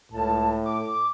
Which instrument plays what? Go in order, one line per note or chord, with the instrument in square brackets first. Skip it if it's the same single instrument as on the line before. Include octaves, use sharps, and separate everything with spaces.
[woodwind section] C#2 A5 [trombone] A2
[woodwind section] D6